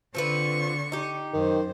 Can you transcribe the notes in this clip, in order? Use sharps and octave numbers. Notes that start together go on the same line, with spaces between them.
D3 C4 F4 B4 C#6
D#4 G4
F#2 D#3 C5